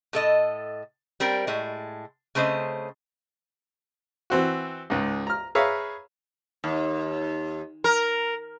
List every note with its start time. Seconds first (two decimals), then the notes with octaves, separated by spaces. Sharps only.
0.13 A2 A4 D#5
1.20 G3 C4 A#4
1.47 A2 G#3
2.35 C#3 A3 C4 C5 D#5
4.30 E3 C4 F#4
4.90 C#2 G#2
5.27 A#5 F6
5.55 G#4 B4 C#5 E5 F5 A#5
6.64 D#2
7.84 A#4